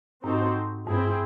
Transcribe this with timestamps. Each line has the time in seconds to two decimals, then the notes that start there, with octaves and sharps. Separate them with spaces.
0.23 G#2 C4 D#4 F#4 A4 C5
0.87 G2 C4 E4 G#4